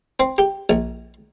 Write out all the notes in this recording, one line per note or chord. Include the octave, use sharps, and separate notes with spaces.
C4
G4
A#1